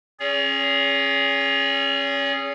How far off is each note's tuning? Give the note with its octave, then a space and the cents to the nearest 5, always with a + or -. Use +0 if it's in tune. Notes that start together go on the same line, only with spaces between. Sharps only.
C#4 -30 G#4 +0 C#5 +40